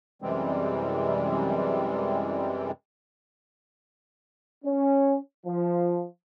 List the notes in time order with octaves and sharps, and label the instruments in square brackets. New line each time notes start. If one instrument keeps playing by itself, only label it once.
[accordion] F#2 C3 E3 G3 G#3 C4
[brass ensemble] C#4
F3